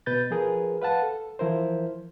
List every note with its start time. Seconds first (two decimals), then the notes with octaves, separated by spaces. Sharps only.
0.06 B2 B4 G6 A6
0.31 F3 F4 G#4 A#4 B4
0.82 B4 F5 F#5 A5
1.02 A4
1.39 E3 F3 E4 A#4 C5